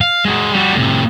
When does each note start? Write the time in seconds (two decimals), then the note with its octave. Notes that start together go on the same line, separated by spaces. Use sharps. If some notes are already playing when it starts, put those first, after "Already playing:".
0.01 F5
0.25 G#3 F#4
0.51 G3 F#4
0.74 A2 C3